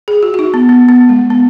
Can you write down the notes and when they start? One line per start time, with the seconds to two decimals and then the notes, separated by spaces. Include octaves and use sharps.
0.08 G#4
0.23 F#4
0.34 F#4
0.39 D#4
0.54 B3
0.69 B3
0.89 B3
1.09 G#3
1.30 B3